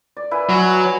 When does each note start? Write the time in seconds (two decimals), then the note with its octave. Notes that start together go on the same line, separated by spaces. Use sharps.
0.17 D5
0.31 E4 B4 G#5
0.49 F#3 D#5